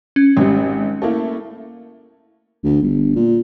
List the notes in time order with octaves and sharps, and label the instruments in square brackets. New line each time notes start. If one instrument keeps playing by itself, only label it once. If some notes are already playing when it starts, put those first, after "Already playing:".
[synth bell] C#4
[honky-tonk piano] G#1 G3
A3 A#3 E4
[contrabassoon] D2
G1
A#2